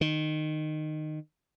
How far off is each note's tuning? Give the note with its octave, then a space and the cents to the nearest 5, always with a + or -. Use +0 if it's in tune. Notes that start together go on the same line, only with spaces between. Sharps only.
D#3 -15